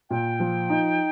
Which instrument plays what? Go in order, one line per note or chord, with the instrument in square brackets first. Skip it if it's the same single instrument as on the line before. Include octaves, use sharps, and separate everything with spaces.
[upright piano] A#2 [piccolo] G5
[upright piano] F3
D#4